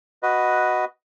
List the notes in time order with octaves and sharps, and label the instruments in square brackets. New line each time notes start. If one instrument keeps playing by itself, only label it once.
[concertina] F#4 B4 D#5